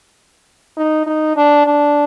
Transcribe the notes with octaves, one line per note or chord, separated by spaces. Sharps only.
D#4
D#4
D4
D4